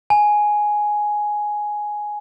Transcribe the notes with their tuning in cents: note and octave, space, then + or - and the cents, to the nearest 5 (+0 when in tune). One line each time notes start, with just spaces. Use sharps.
G#5 +5